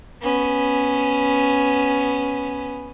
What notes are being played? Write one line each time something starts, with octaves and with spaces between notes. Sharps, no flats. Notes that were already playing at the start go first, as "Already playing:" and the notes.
B3 C#4